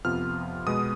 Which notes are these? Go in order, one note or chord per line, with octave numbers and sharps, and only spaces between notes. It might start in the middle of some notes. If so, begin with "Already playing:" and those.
F2 C3 F3 B3 F4 F6
B2 G#3 B3 D#6